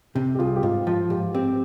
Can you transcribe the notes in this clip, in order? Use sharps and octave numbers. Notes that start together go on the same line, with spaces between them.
C3 G4
G4
C2 F4 G#4
G4
G#2 F4
F3 F4
G#2 G4
C4 G4